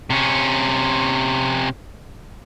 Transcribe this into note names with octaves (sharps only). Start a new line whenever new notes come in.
C3 C#4